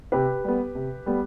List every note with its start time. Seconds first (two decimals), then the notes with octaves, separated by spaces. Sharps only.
0.12 C3 G4 B4
0.44 G3 B3
0.75 C3
1.06 G3 B3